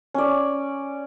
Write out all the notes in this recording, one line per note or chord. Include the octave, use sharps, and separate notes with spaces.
C#4 D5